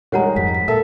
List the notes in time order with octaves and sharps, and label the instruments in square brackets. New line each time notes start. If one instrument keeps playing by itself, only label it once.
[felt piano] D#3 G3 G#3 [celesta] C#5 F#5 A#5
[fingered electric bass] F2 G#2 [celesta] B6
[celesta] B6
[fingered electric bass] A#2 [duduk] A4 [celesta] A#4 [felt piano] E5